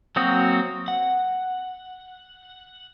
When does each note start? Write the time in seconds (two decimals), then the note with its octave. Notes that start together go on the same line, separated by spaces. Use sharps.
0.16 F#3 A#3 C4 F#4 D#6
0.88 F#5